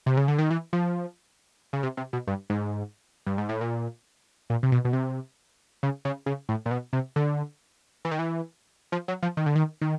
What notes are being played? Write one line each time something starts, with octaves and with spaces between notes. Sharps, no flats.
C3
C#3
D3
D#3
E3
F3
C#3
C3
C3
B2
G2
G#2
G2
G#2
A2
A#2
A#2
C3
B2
B2
C3
C#3
C#3
C#3
A2
A#2
B2
C3
D3
E3
D#3
E3
F3
F#3
F3
D#3
D3
D#3
D#3